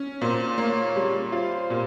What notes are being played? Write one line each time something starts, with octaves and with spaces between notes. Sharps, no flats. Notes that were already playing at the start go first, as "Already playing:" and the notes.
Already playing: C#4
A#2 C5
A#3 C#5
G3
F4 C5
A#2